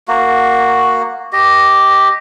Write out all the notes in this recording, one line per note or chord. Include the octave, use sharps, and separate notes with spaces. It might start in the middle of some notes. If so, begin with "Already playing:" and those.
A#3 F#4
G4 D#5